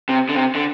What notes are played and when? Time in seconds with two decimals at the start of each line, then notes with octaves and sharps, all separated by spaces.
0.09 C3
0.29 D3
0.35 C3
0.55 D3